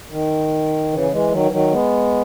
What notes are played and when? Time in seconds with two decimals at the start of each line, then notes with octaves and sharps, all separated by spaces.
0.10 D#3
0.91 C#3 E3
1.11 E3 G#3
1.31 D#3 F#3
1.45 E3
1.51 D#3 F#3
1.71 G#3 B3